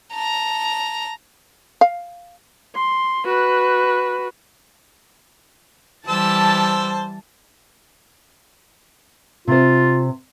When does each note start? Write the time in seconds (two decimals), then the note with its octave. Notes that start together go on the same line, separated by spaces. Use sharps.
0.14 A5 A#5
1.81 F5
2.75 C6
3.25 F#4 B4
6.08 E3 G3 C5 A5 E6
9.48 C3 F4 C5